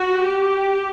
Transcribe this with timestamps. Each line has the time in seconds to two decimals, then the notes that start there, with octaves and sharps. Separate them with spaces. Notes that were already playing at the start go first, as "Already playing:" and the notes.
Already playing: F#4
0.23 G4